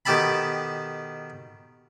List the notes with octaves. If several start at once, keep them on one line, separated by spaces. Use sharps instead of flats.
B2 D#3 G4 A4 A5 B5